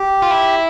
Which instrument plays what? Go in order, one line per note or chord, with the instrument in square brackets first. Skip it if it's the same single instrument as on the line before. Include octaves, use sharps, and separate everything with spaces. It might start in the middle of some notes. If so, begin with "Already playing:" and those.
Already playing: [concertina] G4
[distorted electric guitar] F4
E4